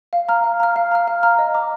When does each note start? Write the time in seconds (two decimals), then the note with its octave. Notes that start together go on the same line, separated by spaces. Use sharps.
0.13 F5
0.29 A#5 F6
0.44 F5
0.60 A#5 F6
0.76 F5
0.92 A#5 F6
1.08 F5
1.23 A#5 F6
1.39 D#5
1.54 A#5 D6